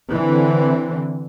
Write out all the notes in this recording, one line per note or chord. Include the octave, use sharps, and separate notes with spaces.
D3 E3 C4